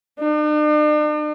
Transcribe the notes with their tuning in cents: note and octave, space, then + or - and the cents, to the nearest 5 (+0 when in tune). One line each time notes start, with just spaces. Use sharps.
D4 +45